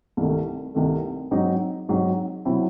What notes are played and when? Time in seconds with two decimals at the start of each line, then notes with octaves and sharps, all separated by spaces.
0.17 C2 C3 D#3 A3
0.75 C2 C3 D#3 A3
1.31 G#2 F#3 C4 D#4
1.89 G#2 F#3 C4 D#4
2.45 C3 F#3 C4 E4